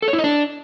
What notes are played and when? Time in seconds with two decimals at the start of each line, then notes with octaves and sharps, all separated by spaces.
0.02 A4
0.08 C#5
0.13 E4
0.19 D#5
0.24 D4